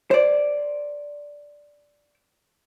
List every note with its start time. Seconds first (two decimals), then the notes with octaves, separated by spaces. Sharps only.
0.11 C5 D5